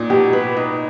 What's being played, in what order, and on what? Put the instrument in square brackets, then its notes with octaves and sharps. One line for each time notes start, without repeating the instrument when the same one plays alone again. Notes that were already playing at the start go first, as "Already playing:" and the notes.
Already playing: [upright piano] A#2 [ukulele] D#4
[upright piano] B2 [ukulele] G4
[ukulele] B4
D#4